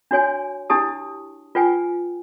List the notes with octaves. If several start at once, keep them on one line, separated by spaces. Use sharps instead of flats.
D4 F#4 C#5 G#5
D4 E4 G4 A5 D#6
F4 B4 G5 G#5